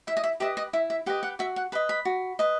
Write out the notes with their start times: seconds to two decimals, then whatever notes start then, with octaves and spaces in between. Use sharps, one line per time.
0.07 E4 E5
0.17 D#5
0.24 E5
0.40 G4 B4 D#5 E5
0.57 D#5
0.73 E4 E5
0.90 E5
1.06 G4 B4 D#5 F#5
1.23 F#5
1.39 F#4 E5
1.56 F#5
1.72 B4 D#5 B5
1.89 B5
2.05 F#4
2.39 B4 D#5